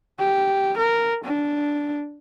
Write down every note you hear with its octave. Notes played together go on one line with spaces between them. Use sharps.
G4
A#4
D4